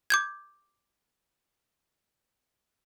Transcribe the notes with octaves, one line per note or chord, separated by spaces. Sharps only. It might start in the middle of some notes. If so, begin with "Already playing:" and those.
D6 G6 G#6